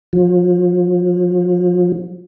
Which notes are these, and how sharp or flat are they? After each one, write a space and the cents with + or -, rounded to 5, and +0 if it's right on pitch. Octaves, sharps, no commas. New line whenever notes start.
F3 +35